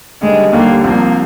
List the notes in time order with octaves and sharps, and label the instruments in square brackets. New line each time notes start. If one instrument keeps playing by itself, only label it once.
[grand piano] D#2 D3 G3 [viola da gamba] G#3
[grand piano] D#2 D3 G3 [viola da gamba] A#3
[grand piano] C2 C3 F3 C4 [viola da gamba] A#3